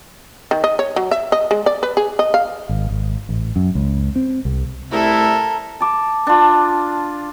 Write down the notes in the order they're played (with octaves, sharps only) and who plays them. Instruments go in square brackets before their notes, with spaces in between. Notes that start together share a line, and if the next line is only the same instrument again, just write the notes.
[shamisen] D#3
D#5
C#5
F#3
E5
D#5
G#3
D5
B4
G#4
D#5
F5
[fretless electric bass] G#1
G#1
A1
F#2
C#2
C4
C2
[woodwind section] C2 A3 E4 [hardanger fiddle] A4 A#4
[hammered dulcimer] A5 D6
D4 F4